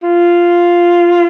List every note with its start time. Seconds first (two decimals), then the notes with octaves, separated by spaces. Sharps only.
0.03 F4